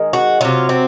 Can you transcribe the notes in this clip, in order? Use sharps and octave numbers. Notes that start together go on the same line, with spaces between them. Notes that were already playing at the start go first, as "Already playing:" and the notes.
Already playing: D#3 G#3
F#4
C3 F#3 F4
C4